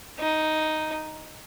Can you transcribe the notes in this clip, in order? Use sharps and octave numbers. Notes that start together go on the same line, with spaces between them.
D#4